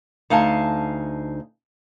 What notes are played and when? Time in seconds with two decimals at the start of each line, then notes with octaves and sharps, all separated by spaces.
0.30 D2 D#4 F5 G#5 A5